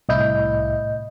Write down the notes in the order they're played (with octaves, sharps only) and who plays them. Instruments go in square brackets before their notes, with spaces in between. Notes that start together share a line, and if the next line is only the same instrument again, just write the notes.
[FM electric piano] C2 E4 [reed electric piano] A2 D#5 G6